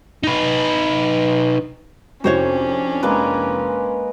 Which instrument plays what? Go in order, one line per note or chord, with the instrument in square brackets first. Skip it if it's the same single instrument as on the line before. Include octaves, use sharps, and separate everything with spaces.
[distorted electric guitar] D#4 B4
[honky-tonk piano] F2 C3 E4 [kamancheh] C#4 D4 [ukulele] F#4 C5 C#5
[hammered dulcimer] G#3 A#3 B4